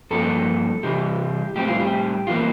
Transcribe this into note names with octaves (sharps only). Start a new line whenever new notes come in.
G2 F3 A#3 A4
C3 E3 G3 G4
A2 G3 C4 G4
F4
G4
E3 G3 A#3 F4